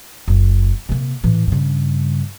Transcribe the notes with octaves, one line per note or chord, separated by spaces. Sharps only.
F#1
C3 A#3
A2 E3
G2 C#3